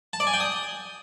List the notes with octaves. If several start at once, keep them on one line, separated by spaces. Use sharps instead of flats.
A5
D5
G#5
G5
D#6